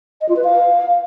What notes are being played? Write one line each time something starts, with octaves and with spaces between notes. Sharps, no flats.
D#5
F4
B4
F5